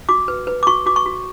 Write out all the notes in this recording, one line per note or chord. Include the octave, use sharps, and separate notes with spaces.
F#4 D6
B4
B4
D6
F#4 C#6
F#4 D6
C#6
F#4